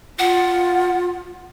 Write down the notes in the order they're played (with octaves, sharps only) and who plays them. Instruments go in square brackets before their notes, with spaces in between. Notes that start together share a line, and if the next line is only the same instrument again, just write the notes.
[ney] F4 [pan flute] F#5